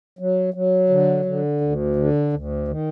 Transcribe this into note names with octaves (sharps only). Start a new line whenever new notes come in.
F#3
F#3
D3
D3
D2
D3
D2
D#3